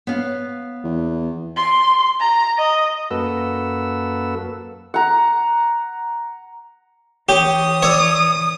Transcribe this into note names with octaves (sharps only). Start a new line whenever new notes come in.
B3 C#5 F5
E2
C6
A#5
D#5
F#2 A#3 F#4 A4 B4 E6
F#5 A#5
E3 G4 C#5 D#6
C#5 D5 E6